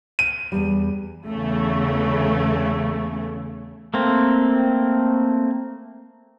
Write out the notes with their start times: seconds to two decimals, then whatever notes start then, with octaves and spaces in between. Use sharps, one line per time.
0.19 D#7
0.52 E2 G3
1.26 E2 C#3 A3
3.94 A3 A#3 C4